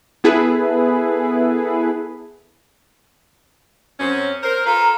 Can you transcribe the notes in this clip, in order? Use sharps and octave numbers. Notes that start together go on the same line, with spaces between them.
B3 E4 G#4 A4 B4
F#2 C4 C#4
A#4 C5
F4 A4 B4 A#5